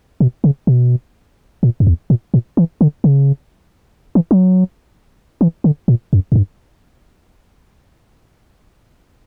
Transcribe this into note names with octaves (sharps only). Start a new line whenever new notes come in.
B2
C#3
B2
A#2
F#2
E2
A#2
A#2
E3
D3
C#3
E3
F#3
E3
D3
A#2
F#2
F#2
G2